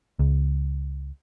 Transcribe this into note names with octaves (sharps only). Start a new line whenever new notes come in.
C#2